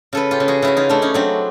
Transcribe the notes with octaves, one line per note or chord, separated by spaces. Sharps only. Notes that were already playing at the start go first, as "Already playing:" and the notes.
C#3 A4 B4
F4 G4
C#3
F#4 G#4
C#3 E4 F#4
D#4 F4
A3 D4 E4
C#4 D#4
F#3 C4 D4